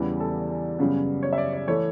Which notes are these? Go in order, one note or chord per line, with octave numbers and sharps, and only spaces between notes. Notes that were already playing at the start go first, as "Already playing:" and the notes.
Already playing: E2 C#3 E3 G3 B3
A4
F#2 C#3 G3 B3
C#5
E5
D5
D5
E3 A3 C#5